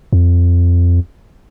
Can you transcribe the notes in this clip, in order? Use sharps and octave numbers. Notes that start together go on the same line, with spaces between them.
F2